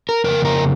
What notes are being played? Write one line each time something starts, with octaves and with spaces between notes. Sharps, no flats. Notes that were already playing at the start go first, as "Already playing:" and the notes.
A#4
F2 C#3 A#3 A#4
A#4